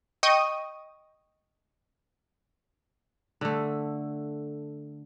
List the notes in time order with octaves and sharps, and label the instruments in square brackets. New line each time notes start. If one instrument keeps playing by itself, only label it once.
[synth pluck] D#5 G5 C#6 D#6 D#7
[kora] D3 A3